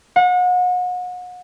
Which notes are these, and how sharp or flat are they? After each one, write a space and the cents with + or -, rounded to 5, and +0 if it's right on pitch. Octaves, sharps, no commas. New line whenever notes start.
F#5 -35